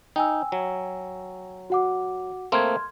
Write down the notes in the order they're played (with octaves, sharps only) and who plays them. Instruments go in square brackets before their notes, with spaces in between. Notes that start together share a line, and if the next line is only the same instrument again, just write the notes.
[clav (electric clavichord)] D#4 [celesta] G5 G#5 E6
[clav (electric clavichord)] F#3
[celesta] F#4 F#5 D6
[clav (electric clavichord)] A3 A#3 C4 [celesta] C6 F6 G#6